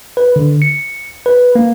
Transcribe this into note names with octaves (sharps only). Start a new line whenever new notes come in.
B4
D3
C#7
B4
A#3